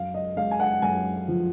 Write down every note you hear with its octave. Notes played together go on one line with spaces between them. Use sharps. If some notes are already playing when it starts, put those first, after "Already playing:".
Already playing: F#2 F5
D#5
G#3 F5
G#5
F#5
F#2 G#5
F3